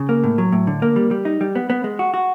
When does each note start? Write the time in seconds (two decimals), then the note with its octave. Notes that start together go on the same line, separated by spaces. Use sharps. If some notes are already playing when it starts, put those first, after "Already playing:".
Already playing: C#3
0.09 A#3
0.24 A2
0.38 F#3
0.52 A2
0.67 D3
0.82 A#3
0.96 G3
1.11 G3
1.25 D#4
1.41 G3
1.55 B3
1.70 B3
1.84 G#3
1.99 F#4
2.14 F#4